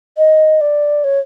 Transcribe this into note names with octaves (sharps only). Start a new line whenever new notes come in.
D#5
D5
C#5